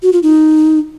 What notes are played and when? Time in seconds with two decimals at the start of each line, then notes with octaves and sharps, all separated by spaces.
0.03 F#4
0.13 F4
0.23 D#4